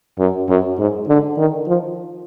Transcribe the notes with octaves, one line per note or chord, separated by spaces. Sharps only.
F#2
F#2
G#2
D3
D#3
F3